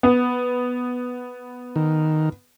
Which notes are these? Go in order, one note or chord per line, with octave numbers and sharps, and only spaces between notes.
B3
D#3